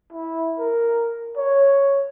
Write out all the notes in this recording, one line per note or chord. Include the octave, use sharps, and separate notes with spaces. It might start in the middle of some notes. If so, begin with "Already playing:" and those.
E4
A#4
C#5